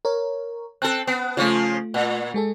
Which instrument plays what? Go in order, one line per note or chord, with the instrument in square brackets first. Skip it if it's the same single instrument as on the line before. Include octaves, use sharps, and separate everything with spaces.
[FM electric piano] A#4 C#5
[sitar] C4 A4 [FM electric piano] A5 F#6
[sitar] B3
[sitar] C#3 F3 C#4 [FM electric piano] A3 F4
[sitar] A#2
[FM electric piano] G#3 G#4 A4